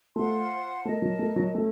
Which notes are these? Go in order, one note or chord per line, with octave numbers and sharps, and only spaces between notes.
A3 F4 C5 F#5 C6
A3 A#4 D#5 A5
F#3
A3
F#3
A3 C#4 A4